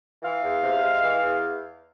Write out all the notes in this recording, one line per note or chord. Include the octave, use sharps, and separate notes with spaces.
E3 F5
E2
C3
G#3
E3
E2